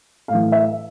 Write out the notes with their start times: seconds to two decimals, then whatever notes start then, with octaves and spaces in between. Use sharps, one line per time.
0.28 A2 F5
0.34 E3
0.52 E5